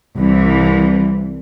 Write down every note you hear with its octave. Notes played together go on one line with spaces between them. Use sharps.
C2 E3